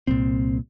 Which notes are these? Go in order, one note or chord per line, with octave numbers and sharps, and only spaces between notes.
C2 A#2 C4